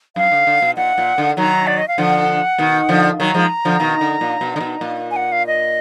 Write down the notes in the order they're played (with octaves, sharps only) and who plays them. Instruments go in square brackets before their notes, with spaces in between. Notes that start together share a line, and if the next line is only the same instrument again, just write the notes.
[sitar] F#2 [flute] F5
[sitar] D3
D3
B2
[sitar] A#2 [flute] F#5
[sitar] A#2
D3
[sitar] D#3 F#3 [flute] A#5
[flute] D5
D#5
F5
[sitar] D3 F3 [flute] F#5
[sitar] B2 D#3
D3 F3
[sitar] D#3 F#3 [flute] A#5
[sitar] F3 G#3
D3 F3
B2 D#3
D3
A#2
B2
D3
B2
A#2
[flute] G#5
F#5
F5
D#5